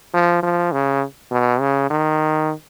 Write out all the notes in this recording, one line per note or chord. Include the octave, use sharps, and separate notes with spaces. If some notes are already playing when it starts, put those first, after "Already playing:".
F3
F3
C#3
B2
C#3
D#3